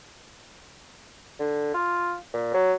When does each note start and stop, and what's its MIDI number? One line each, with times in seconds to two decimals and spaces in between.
1.40 1.71 50
1.74 2.14 65
2.34 2.51 46
2.54 2.73 54